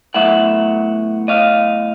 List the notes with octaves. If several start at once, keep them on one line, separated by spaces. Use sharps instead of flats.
A2 F#3 B3 E5 F#5
D#5 F5